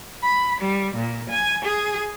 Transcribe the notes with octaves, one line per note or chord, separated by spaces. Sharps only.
B5
G3
A#2
G#5
G#4